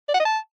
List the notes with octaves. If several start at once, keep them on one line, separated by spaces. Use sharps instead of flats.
D5
F#5
D#5
A5